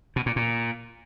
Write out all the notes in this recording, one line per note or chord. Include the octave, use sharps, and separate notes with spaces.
B2
A#2
A#2